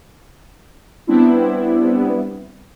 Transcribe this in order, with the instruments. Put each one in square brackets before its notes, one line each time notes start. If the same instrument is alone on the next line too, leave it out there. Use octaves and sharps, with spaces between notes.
[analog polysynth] G3 B3 C4 D4 E4